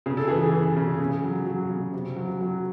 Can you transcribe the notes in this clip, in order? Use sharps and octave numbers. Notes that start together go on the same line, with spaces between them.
C#3 G#4
A4
E3 G#4
E3
C#3
C#3
F#3
F#3
C#3
C3
F#3
F#3